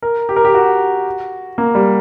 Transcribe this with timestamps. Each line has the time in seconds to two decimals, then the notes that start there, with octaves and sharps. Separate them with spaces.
0.02 A#4
0.29 G4
0.36 A#4
0.45 G4
0.54 F#4
1.58 A#3
1.75 G3